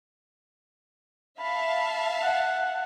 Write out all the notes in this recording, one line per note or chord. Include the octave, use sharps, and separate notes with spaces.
E5 F5 A5 B5
F#5